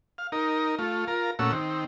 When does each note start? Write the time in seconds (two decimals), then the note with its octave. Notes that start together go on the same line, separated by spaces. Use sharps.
0.18 F5
0.32 D#4 A#4
0.79 A3 F4
1.08 F4 A#4
1.39 A#2 A3 C#4 F#4 E6
1.52 D#3 C4